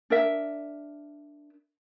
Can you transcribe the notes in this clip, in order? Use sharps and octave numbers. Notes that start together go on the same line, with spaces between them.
D4 A#4 E5